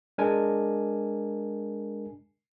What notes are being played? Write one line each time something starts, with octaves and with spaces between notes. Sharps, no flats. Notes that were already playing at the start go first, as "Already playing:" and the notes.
G#3 D4 A#4 G#5